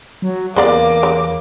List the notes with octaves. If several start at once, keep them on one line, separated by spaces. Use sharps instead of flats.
F#3
E2 C#3 A#3 D5 F5 D6
C#3